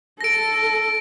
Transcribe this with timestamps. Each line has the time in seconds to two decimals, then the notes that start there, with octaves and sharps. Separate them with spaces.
0.21 A4 A#6 D7